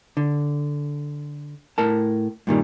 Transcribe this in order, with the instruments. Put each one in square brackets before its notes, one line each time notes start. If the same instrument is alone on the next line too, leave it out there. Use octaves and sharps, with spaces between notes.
[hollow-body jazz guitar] D3
A2 A#4 A5
G2 A#2 D#3 G3